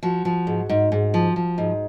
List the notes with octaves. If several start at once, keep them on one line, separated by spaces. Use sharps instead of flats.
F3 F#4
F3
G#2
G#2
G#2
F3
F3
G#2